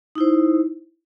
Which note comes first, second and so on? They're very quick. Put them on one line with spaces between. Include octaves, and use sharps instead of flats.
D#4 E4 C5